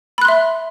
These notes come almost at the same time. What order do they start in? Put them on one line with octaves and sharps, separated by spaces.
B5 F#6 C6 E5